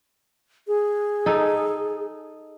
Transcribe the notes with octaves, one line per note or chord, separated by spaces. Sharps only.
G#4
D#4 A4